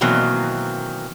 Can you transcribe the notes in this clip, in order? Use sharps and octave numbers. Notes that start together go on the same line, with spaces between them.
B2 D#3 E3 F#3 A#3 C4